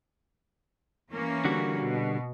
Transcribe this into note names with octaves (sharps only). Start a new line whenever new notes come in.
E3 A#3 C#4
D3 G3 F#4
B2